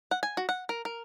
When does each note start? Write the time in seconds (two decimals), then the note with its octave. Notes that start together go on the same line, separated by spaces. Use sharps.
0.11 F#5
0.23 G#5
0.37 F#4
0.49 F#5
0.69 A#4
0.85 A#4